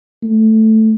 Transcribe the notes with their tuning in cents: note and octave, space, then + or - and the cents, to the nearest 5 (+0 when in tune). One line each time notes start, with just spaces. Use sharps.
A3 +0